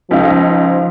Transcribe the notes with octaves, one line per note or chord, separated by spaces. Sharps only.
C#2 F3 D#4 F5